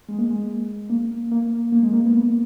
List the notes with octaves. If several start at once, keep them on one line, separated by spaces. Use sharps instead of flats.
G#3
A#3
G#3
A#3
A#3
A#3
G#3
A#3
B3
A#3